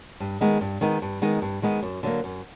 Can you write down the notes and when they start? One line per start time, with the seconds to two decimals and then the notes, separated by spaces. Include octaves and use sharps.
0.20 G2
0.41 D#3 G#3 B3 D#4
0.61 G2
0.81 D#3 G#3 B3 D#4
1.02 G2
1.22 D#3 G#3 B3 D#4
1.42 G2
1.62 D#3 G#3 B3 D#4
1.83 F#2
2.03 D3 F#3 A#3
2.24 F#2